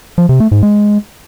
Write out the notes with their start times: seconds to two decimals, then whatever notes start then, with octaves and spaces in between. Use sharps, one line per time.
0.18 F3
0.29 C3
0.40 A3
0.51 G#2
0.63 G#3